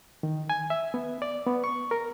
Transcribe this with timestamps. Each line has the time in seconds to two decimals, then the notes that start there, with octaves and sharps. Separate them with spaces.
0.23 D#3
0.50 G#5
0.70 E5
0.94 B3
1.22 D5
1.47 B3
1.64 C#6
1.91 A#4